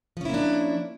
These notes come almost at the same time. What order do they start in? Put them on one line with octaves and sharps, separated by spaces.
F3 C#4 E4 A#3 D4